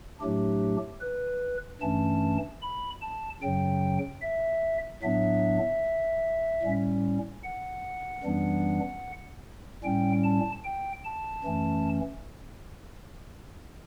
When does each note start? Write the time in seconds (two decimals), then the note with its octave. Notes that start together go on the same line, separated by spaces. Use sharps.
0.21 A2 F#3 A3 D4 G4
1.01 B4
1.81 G2 E3 A3 C#4 A5
2.62 B5
3.02 A5
3.42 F#2 C#3 F#3 G5
4.22 E5
5.03 A2 F#3 B3 D4 E5
6.63 A2 G3 C#4
7.44 F#5
8.23 F#2 E3 G3 B3 D4
9.84 A2 G3 C#4 G5
10.24 A5
10.64 G5
11.05 A5
11.44 F#2 E3 A3 C#4